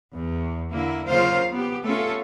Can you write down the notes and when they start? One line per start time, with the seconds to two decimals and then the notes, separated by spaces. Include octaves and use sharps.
0.16 E2
0.72 D3 A#3 E4
1.08 C#3 F#3 A#3 F4 C5 F5
1.53 B3 G4
1.85 A3 B3 C#4 F4 A4